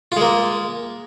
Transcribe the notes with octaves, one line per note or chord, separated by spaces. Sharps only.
G#3 A#3 F4